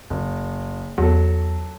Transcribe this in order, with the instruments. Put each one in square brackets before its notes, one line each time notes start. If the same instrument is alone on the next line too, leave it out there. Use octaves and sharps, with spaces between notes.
[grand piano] F#1
[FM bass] E2 [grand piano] F#3 A4